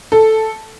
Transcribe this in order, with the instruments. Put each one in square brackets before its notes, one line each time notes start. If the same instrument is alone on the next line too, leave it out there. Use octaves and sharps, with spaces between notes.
[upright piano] A4